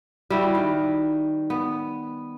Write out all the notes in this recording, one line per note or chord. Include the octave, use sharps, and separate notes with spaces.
G3 E4 F#4
D#3
B3